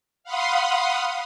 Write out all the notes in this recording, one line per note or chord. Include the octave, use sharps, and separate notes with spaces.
F5 F#5 B5 C6 D#6